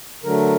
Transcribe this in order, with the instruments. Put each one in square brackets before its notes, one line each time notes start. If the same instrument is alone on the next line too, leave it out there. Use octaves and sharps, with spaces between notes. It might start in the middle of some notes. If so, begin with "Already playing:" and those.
[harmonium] D3 F#3 A3 A#4